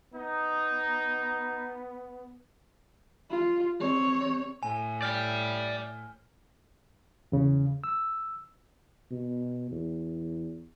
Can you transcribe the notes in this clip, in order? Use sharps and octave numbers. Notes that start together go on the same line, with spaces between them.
B3 D#4
F4
C4 C#5
A2 G#5
D5 G5 F6 G6
E2 C#3
E6
B2
E2